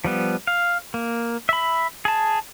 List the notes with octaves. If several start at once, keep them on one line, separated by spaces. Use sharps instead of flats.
F3 G3 B3
F5
A#3
E5 B5
G#4 A5